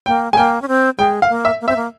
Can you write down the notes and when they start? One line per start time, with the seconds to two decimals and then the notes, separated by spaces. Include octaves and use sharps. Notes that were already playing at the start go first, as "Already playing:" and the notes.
0.06 A#3 G5
0.33 G#3 G#5
0.37 A#3 G5
0.62 C#4
0.68 C4
0.98 G#3 G5
1.22 F5
1.29 A#3
1.45 E5
1.61 A#3
1.68 C4 E5
1.76 A#3